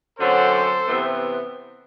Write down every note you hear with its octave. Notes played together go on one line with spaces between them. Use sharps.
F#2 D3 F#3 C4 A4 C5
C3 E3 B3